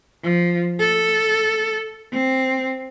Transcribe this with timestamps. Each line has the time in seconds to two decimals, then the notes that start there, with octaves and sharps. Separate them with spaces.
0.24 F3
0.80 A4
2.13 C4